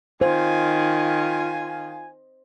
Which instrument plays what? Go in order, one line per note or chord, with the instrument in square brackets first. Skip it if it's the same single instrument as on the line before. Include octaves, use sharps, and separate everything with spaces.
[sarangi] D#3 [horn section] F4 G#5 [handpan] C5